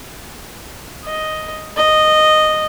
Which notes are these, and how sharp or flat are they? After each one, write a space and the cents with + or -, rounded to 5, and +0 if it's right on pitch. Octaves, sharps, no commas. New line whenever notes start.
D#5 +5
D#5 -10